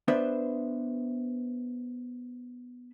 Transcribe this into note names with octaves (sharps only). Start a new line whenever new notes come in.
B3 D4 B4 C5 E5